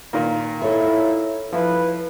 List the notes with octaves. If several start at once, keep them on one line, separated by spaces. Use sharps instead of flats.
A#2 D#3 A#3
E4 A4 C#5
F3 E4 B4